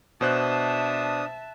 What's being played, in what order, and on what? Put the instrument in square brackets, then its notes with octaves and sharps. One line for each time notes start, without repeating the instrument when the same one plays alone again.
[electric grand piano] B2 C5 F#6 [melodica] D4 D#6 [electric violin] E5 A5